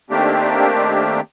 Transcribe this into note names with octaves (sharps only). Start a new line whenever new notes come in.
D#3 A3 A#3 C4 D4 G4